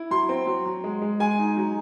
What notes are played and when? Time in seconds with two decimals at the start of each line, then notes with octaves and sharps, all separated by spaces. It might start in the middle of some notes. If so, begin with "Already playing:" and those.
Already playing: E4
0.11 F#3 C6
0.29 C4
0.47 F#3
0.65 F#3
0.84 G#3
1.02 G#3
1.20 G#3 G#5
1.39 D#4
1.57 F#3